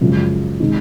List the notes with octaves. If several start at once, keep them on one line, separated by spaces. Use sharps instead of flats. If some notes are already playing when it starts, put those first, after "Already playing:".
F#2 C#3 F3 G#3
C3 D#3 G#3 D#4